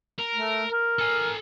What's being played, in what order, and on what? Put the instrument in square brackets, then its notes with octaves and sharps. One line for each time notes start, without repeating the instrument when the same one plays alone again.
[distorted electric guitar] A#4
[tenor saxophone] A3
A#4
[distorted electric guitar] A4 G#5